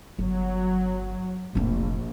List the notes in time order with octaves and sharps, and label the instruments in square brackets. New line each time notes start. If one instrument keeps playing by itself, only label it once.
[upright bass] G1 [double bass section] F#3
[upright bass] F1 D4 [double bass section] A#1